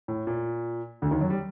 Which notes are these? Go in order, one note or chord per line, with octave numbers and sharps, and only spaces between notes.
A2
A#2
D2 D3
D#2 D#3
F#2 F#3
G3